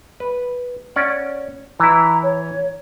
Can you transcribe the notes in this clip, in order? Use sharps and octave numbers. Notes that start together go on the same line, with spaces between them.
B4
C#4 D5 F#5
E3 E4 A#5
C#5